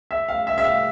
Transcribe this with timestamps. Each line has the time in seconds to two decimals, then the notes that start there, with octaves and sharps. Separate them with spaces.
0.11 E5
0.29 F5
0.47 E5
0.58 E5
0.65 F5